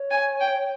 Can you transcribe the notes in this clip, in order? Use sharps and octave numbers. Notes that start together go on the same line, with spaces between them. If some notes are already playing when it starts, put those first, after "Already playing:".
Already playing: C#5
G#5
G5